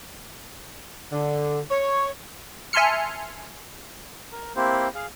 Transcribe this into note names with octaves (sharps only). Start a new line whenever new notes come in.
D3
C#5
E5 G#5 A5 C6 F6 C#7
A#4
A#3 C4 E4 G4 C5
G#4 F5